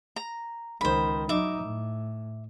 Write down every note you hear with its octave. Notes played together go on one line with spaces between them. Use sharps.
A#5
C#2 D#3 C5 B5
F#3 D#4 E5 D6
A2